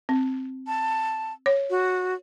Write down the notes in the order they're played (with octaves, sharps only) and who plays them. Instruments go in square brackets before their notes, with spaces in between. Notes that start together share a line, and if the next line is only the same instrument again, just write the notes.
[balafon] C4
[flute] A5
[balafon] C#5
[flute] F#4